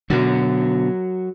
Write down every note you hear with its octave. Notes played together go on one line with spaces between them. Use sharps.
B2 D3 F#3 F#4 A#4